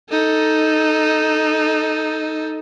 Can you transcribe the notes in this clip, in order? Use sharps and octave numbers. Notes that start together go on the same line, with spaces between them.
D#4 A4